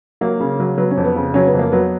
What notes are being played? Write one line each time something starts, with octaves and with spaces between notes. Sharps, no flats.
F#3 A#3
C#3
F#3
F#3 B3
C#4
F2
B3
C#3
F#3 C#4
B3
F2
A#3
F#3 B3